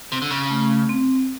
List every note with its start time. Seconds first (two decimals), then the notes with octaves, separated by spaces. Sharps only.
0.12 C3
0.22 D3
0.31 C#3
0.50 A3
0.89 C4